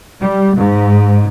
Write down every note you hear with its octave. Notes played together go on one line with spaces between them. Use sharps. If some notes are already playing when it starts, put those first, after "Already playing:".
G3
G#2